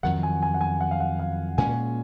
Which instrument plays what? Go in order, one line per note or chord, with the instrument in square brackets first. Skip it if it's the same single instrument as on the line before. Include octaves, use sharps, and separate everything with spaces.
[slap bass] F2 D#3 F#3 [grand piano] F#5
[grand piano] G#5
G#5
F#5
G#5
F#5
F5
F#5
F5
[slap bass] A#2 G#3 C#4 [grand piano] G#5